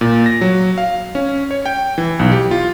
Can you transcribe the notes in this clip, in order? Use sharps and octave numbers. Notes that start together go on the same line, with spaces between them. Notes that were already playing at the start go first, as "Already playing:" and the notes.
A#2
A#6
F#3
F5
C#4
C#5
G5
E3
B1
G4
F4